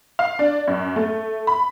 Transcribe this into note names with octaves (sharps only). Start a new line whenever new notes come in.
F5
D4
F#2
A3
B5